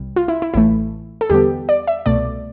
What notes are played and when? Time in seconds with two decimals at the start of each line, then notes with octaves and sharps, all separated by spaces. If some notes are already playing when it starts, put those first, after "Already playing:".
Already playing: C2 C3 G3
0.16 F4
0.28 E4
0.42 E4
0.54 A1 A2 E3 A3 E4
1.21 A4
1.30 E2 D3 G3 B3 G4
1.69 D5
1.87 E5
2.06 C2 B2 A3 D5